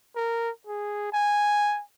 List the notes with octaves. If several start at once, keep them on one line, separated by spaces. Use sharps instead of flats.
A#4
G#4
G#5